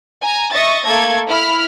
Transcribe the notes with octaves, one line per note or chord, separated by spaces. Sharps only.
G#5 A#5
D#5 E5 C#6 A6 A#6
A3 A#3 A4 G#6
E4 B5 F6